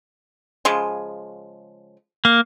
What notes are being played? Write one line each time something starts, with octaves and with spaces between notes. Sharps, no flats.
C#3 F3 G#3
A#3